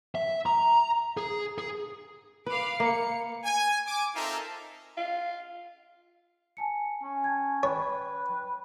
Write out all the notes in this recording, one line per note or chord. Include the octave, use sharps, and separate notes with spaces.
E5
A#5
G#4
G#4
B4 F5 B5 D6
A#3 C#7
G#5
G#5 D6
C4 D#4 F4 A4 A#4 E5
F4
G#5 A5 C#7
C#4
G5 A5 G#6
B4 C#5 G5